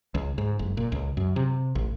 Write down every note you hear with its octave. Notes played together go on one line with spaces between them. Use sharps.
C#2
G#2
F#1
A#2
C#2
F#2
C3
A1